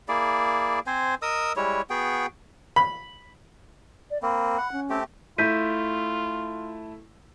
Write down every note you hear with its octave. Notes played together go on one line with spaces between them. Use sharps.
A#3 E4 G#4 D5
C4 C5 G#5
A#4 D#5 D#6 E6
G3 G#3 E4 C#5
B3 F#4 G#4 G5
B5
D5
A#3 C4 B5
F#5
C#4
A3 C4 G4
A3 E4 F4 G6 B6 D#7